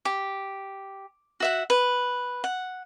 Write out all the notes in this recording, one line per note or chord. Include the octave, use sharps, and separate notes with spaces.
G4
F#4 E5 F#5
B4
F#5